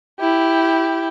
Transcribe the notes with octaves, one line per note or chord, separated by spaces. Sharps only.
E4 G4